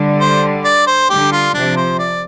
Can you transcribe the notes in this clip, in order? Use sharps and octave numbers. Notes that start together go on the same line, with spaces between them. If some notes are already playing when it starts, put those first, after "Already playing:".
Already playing: D3 G3
C5
D5
C5
D3 G3 G4
F4
C3 F3 D4
C5
D5